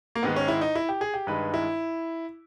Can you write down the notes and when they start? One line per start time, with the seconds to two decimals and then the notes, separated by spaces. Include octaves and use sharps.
0.15 A#3
0.23 G#2 D#3 G#3 B3
0.36 C#4
0.48 E4
0.61 D#4
0.75 E4
0.89 G4
1.01 G#4
1.14 G4
1.27 G2 D#3 G#3 B4
1.54 E4